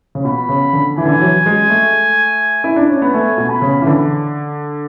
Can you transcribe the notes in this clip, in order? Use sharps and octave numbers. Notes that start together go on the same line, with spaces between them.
C#3
B2 B5
C#3
D3
E3 G#5
D3
E3
F#3
G#3
A3
E4
D4
C#4
B3
A3 G#5
B2
B5
C#3
E3
D3